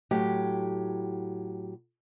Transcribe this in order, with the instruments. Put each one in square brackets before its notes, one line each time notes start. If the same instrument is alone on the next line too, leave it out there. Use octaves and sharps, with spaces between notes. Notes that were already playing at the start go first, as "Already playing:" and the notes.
[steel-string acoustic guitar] A2 F#3 G4